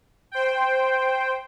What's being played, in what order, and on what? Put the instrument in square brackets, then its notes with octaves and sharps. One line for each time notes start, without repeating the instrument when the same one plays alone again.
[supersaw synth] C5 G5